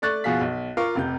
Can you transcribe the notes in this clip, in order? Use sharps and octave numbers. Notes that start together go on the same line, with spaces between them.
A3 D5 C#6 F#6 A6
B2 F3 F#4 G#4 F5 B6
B1
F4 A#4 F5 C#6 D6
F1 C3 G6